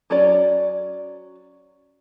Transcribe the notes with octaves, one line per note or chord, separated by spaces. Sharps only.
F#3 C#4 C#5 D5